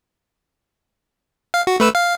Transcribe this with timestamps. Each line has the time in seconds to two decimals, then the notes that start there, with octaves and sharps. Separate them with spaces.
1.54 F5
1.67 F#4
1.80 A3 B4 E6
1.95 F5